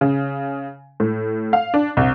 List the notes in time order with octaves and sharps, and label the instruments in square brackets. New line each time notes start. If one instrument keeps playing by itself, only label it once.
[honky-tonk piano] C#3
A2
F5
D4
C2